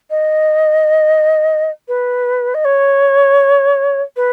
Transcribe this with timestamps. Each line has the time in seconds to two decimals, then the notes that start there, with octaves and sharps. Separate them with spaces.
0.10 D#5
1.88 B4
2.55 D#5
2.65 C#5
4.16 B4